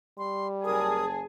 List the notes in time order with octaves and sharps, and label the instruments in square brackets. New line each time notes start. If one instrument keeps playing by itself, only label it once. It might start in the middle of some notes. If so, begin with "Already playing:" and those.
[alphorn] G3 [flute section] C6
[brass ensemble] F#1 A5 [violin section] G#4 [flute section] A#4 D#6